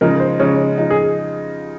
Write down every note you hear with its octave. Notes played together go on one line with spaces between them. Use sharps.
C#3 F3 G#3 D#4 A#4
C5
C#3 F3 G#3 D#4 C#5
C#3 F3 G#3 D#4
G#4